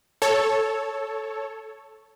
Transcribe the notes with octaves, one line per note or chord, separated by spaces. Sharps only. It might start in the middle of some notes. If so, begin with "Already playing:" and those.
A4 C#5